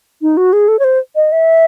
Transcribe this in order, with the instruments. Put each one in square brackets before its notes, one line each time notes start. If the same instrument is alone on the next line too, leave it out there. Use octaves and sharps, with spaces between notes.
[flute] D#4
F#4
G#4
A4
C#5
C5
D#5
E5